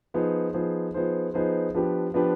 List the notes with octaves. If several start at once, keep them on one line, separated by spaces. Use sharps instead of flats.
F3 B3 D#4 G#4 C5
F3 B3 D#4 G#4 C5
F3 B3 D#4 G#4 C5
F3 B3 D#4 G#4 C5
F3 B3 D4 G4 B4
F3 B3 D4 G4 B4